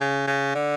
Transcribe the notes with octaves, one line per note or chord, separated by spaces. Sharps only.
C#3
C#3
D3